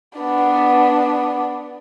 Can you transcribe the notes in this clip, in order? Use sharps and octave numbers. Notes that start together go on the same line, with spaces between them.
B3 D4